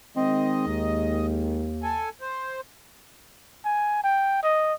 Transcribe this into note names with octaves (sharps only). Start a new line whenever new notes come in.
D#3 G#3 C4 D#5
D#2
A4 G#5
C5
G#5
G5
D#5